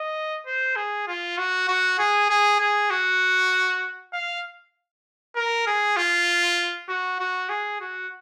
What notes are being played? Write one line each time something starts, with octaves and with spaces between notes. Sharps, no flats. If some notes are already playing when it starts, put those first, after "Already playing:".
Already playing: D#5
C5
G#4
F4
F#4
F#4
G#4
G#4
G#4
F#4
F5
A#4
G#4
F4
F#4
F#4
G#4
F#4